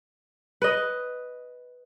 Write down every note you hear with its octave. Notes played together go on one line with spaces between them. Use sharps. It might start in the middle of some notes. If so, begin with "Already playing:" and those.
B4 D#5